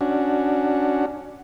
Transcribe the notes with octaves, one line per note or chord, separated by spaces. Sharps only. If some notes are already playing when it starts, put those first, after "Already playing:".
C#4 D4 F#4